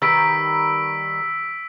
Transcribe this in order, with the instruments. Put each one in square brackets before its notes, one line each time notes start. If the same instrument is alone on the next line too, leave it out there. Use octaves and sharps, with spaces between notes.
[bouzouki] D#3 G3 B4 [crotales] E6 B6 D7